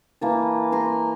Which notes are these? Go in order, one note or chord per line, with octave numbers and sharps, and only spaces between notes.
E3 A#3 A5
A#5 C6